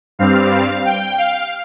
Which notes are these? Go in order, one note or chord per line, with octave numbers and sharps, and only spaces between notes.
G2 G3 C4 F5
G5
F5